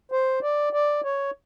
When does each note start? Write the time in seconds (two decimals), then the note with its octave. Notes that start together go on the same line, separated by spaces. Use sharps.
0.12 C5
0.43 D5
0.73 D5
1.04 C#5